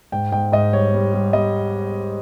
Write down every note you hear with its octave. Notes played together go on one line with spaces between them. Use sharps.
G#2 G5
G#2 G5
G#2 D#5
G3 C#5
G3
G3
G3 D#5